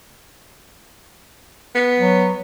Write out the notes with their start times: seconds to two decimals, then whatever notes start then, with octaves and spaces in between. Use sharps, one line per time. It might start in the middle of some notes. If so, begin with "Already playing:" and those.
1.75 B3
2.00 F#3